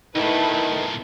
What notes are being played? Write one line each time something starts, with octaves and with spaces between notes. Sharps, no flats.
B1 A#2 D#3 A3 E4 B4